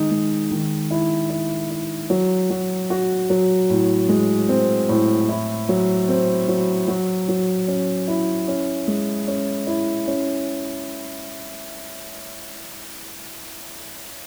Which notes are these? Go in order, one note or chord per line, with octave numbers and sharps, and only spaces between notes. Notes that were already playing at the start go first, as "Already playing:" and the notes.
Already playing: D#3 G#3 D#4
G#3
D#3
E4
E4
E4
F#3
F#3
F#4
F#3
A2
G#3
C4
A2
E4
F#3
C4
F#3
F#3
F#3
C#4
E4
C#4
G#3
C#4
E4
C#4